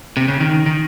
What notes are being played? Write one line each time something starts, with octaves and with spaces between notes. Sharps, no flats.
C3
C#3
D#3
D#3